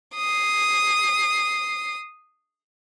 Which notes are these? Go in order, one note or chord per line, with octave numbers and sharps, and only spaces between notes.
D#6 C7